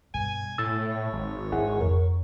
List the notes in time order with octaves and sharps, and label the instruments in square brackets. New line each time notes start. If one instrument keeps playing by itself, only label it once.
[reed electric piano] G2 [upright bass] B2 [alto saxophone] G#5
[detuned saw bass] A2 [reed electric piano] E6 A6
[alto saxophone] C#5
[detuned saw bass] G#1
[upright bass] D4 [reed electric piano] E4 G#4 F#5
[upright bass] F2 [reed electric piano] A#4